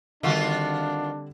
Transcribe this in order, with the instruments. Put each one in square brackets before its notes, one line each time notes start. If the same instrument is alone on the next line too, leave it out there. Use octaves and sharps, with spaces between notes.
[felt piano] D3 G3 C4 [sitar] D#3 F4 F#4 [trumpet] D4